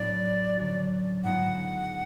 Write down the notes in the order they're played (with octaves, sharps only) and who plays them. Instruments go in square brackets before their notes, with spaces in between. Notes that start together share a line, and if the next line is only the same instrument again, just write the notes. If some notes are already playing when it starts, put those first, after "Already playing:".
Already playing: [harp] A2 F#3 B3 D4 [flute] D5
[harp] D3 F#3 C#4 F#4
[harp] G#2 G#3 B3 F4 [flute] F#5